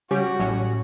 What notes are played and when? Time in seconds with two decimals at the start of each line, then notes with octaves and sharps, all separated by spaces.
0.11 C#3 G3 C#4 F#4 G4
0.39 A1 A2 F#3 C#4